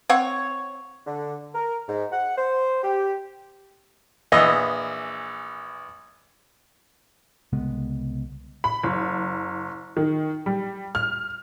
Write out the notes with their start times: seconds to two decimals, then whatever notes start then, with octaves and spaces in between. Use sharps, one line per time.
0.09 C4 C#5 F#5
1.06 D3
1.54 A#4
1.88 G#2
2.12 F#5
2.36 C5
2.83 G4
4.32 A#1 E3 D#5
7.53 C2 C#3 G#3 B3
8.64 B5
8.83 F#1
9.97 D#3
10.46 G3
10.95 F6